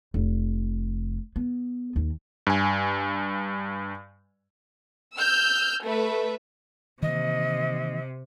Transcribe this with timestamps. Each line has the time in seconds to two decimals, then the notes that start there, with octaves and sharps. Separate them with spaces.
0.14 F1
1.36 B3
1.96 D#2
2.47 G2 G#5
5.17 E6 F6 G6
5.85 A3 B4 E5
7.02 C3 D#3 E3 A#3 D#5